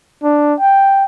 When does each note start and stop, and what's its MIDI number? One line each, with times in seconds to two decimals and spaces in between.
0.23 0.54 62
0.60 1.05 79